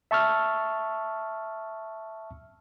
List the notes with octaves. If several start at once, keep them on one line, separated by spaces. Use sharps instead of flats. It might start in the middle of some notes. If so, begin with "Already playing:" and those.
E5 A5 C#6 E6 F6